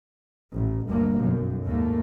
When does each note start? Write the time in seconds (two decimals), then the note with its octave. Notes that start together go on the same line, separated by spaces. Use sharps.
0.53 A1
0.87 G1 D2 G2 A#3
1.18 B1 F#2
1.64 D#2 G#2 D#3 A3 A#3